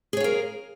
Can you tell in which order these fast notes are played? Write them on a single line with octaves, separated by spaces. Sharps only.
G#4 C#5 F5 A#4